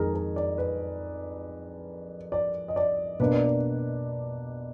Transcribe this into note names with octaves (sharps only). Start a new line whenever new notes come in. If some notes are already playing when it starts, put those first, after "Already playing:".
Already playing: F2 D#3 G#3 G#4 A#4
A#4
D5
B4
D5
D#5
D5
B2 A#3 D4 B4
D5
B4